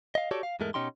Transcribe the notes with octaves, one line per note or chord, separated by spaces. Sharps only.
D#5 F5
F#4 G4 A4 C#5 D5
F5
E2 G#2 G#3 A3 A#4
B2 C#4 D#4 G4 C6